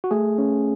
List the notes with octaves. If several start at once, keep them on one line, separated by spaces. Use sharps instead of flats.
F#4
A3 G#4
C#4